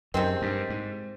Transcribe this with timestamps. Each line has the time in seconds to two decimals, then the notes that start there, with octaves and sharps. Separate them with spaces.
0.14 F#2 C3 D#3 G#3 C4
0.42 G2
0.70 G#2